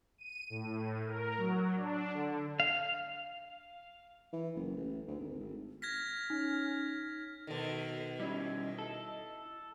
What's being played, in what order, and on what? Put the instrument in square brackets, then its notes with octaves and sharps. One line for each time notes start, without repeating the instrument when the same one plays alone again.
[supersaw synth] D#7
A2
A#4
F#3
D4
D3
[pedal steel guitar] F5
[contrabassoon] E3
F#1
A1
D2
G#1
G#1
[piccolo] F6 [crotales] G#6 A#6 B6
[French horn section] C#4 [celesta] D#4
[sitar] B2 D#3 [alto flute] A4
[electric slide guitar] G3 C#4 [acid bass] E4 [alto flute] D#5
[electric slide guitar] A4